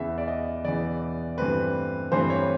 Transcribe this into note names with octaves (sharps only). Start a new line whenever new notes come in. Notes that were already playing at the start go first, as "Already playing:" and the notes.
Already playing: E2 C#3 E3 E5
D5
D#5
E2 C#3 E3 D5
G2 E3 A3 C4 B4
G2 E3 A3 C4 C5
C#5